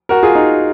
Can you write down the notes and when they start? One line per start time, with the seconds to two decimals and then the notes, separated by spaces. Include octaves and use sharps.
0.09 F#4 A#4
0.23 F4 G#4
0.35 D#4